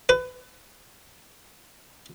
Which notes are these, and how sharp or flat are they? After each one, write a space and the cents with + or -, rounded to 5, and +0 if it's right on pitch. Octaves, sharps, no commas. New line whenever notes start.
B4 +30